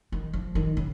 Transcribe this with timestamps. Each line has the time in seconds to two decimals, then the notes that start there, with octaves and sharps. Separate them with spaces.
0.12 D#3
0.33 F3
0.55 D#3
0.77 C#3